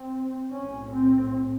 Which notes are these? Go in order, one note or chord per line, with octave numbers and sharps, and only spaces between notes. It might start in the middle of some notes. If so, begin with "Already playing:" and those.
Already playing: C4
B1 A2 C#4
C4